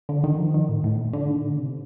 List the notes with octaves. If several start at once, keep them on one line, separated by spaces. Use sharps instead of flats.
D3
D#3
F3
D#3
A2
A2
A#2
D3
D#3
D3
C3